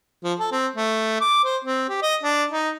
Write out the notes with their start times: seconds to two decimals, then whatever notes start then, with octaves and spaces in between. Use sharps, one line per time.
0.24 F3
0.40 A4
0.52 C4
0.76 A3
1.21 D6
1.44 C5
1.65 C4
1.89 G4
2.02 D#5
2.23 D4
2.51 D#4